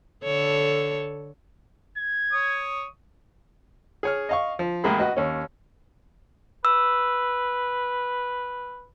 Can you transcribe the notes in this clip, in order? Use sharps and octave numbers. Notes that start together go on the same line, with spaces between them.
D3 A4 C#5
G#6
C#5 D#6
G#4 C#5 F6
D#5 F5 C#6
F3
A1 G#3 A#3 G#4 B5
F#4 B4 D#5
D#2 C#4
B4 E6